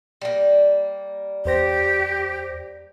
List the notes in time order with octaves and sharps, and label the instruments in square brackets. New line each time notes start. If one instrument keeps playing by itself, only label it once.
[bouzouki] G3 A#3
[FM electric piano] E2 C5 A#6 [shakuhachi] G4